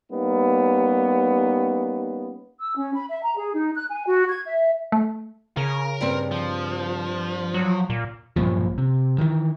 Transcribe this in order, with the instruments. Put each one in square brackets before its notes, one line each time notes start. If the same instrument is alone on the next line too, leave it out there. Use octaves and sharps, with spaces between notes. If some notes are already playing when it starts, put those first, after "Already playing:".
[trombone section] G3 A#3 B3 C#4 D#4
[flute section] E6
C#4
B5
E5
A#5
G#4
D#4
F#6
G#5
F#4
G#6
E5
[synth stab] A3
[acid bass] C#3 [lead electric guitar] A#4
[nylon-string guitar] G2 C4
[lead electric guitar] F3
[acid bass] F#3
A#2
[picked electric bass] B1 G2 A#2 F3
C3
D#3 E3